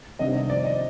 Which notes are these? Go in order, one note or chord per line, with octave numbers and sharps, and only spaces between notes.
C3 D#3 G3 B3 D4 D#5
D#5
F3 C4 D5
D#5